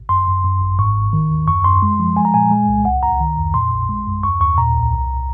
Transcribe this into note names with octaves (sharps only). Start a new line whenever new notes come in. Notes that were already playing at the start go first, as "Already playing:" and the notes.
Already playing: G#1
F#2 C6
F#2
F#2
G#1
G#2 C#6
G#1
D#3
D#2
F#2 C#6
F#2 C6
G#3
F3
G#3 G#5
A#5
A#2 G#5
G#3
C2
C#2 F#5
C#2 A#5
D#3
F2
A#2 C6
A#1
G#3
F#2
D#2 C#6
D#2 C#6
A#2 A#5
C2
C2